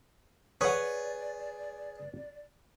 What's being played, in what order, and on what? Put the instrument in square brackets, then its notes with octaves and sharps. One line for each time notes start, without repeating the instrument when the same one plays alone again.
[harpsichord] G#4 [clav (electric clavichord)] B4 [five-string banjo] C#5 F#5 [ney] D5